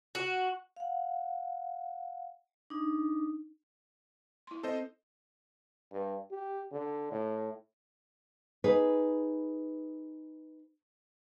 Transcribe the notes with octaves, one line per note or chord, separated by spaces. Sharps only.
F#4
F5 F#5
D4 D#4
E4 C6
C4 A4 C5 D#5
G2
G4
D3
A2
D#4 G#4 B4